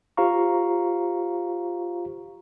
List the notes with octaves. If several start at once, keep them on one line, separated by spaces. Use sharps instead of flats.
F4 G4 C5 F5 A#5 C#6